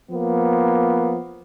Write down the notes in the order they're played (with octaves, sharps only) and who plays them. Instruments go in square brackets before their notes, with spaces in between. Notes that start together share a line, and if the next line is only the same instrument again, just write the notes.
[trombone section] F3 A#3 B3